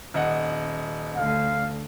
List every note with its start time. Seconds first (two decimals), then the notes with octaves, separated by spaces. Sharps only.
0.14 D#1 D#5 F#5
1.16 D2 D3 F5